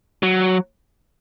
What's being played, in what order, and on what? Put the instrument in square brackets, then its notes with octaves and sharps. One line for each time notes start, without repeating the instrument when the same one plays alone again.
[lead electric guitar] F#3